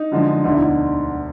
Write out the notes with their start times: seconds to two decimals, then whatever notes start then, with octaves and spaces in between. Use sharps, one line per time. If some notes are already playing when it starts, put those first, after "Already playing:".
Already playing: D#4
0.11 F#2 D3 F3 G#3
0.44 E1 D2 D3 D#4
0.52 E4
0.59 D#4